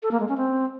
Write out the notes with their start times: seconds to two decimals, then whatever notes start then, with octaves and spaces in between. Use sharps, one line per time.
0.03 A4
0.11 A#3
0.20 G#3
0.29 C#4
0.37 C4